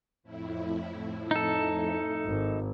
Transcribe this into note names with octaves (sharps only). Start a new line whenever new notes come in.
F2 A2 E4
D#4 A4
G#1